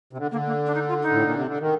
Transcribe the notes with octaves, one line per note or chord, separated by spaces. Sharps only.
C3
D3
D3 A#3
A#3
D4
D#4
F4
D#4
A2
A#2
C3
D3
D#3